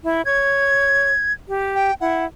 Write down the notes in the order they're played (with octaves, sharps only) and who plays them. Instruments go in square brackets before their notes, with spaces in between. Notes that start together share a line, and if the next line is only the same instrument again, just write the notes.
[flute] E4
[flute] C#5 [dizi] G#6
[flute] G4
[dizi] G5
[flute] E4 [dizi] F#5